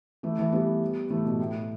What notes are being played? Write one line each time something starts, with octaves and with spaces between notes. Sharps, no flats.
E3 A3
E3 A3
G3 B3
E3 A3
B2
A2